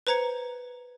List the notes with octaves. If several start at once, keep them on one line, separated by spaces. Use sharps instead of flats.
B4 C5 A#5 G#6 C#7